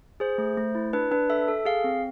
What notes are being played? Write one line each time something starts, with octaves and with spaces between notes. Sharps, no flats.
G#4 C5
A3
A3
E4
D4 B4
D4 B4
A4 E5
A4
G#4 F5
C4